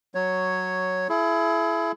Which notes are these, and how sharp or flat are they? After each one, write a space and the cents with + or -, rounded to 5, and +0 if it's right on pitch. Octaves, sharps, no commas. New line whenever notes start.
F#3 +0 C#5 +0
E4 +25 G#4 +45